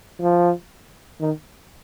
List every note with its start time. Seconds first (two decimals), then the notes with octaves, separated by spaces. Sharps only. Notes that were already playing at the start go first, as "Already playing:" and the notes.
0.21 F3
1.20 D#3